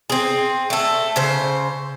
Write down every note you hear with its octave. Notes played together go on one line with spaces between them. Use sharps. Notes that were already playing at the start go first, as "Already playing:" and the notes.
C4 G#4
A3 A4
C#3 C5